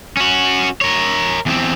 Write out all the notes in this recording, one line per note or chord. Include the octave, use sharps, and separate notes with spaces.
C#4 F#4
A#4 C#5
E2 C4